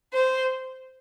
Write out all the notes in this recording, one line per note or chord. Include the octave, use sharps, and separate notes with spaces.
C5